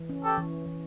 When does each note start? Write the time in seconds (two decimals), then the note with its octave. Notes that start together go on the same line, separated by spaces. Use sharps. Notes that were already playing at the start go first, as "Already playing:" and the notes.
Already playing: E3
0.09 C#4
0.24 G4 A4
0.38 E3
0.66 E3